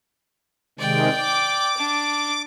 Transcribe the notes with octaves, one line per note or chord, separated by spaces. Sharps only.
C3 D#3 G#3 D5 G5
D6
D4